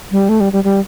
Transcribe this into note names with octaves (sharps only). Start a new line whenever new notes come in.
G3
A3
G3
G3
G3